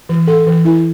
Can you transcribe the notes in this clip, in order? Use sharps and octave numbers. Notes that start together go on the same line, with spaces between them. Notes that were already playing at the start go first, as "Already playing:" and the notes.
E3
A4
E3
E4